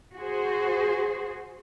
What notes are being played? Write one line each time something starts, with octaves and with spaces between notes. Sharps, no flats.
F#4 G#4 C5